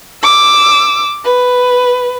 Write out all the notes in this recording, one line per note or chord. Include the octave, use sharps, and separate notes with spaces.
D6 E6
B4